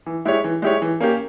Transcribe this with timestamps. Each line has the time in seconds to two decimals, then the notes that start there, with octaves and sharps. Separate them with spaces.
0.06 E3
0.25 G#3 E4 G4 C#5
0.44 E3
0.62 G#3 E4 G4 C#5
0.82 E3
1.00 A#3 C#4 G4